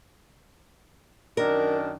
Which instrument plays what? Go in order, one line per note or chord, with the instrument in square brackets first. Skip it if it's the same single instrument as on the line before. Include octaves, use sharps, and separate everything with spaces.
[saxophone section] F#2 D#3 D4 [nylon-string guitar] A#4